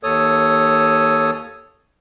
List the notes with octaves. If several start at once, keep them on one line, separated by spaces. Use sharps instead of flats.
D#2 A4 C#5 D#6